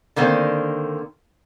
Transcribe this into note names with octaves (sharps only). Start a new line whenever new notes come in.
D3 D#3 A#3 C4